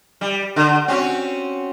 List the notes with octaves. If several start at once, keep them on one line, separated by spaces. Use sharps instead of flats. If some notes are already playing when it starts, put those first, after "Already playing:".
G3
D3
C4 C#4 F#4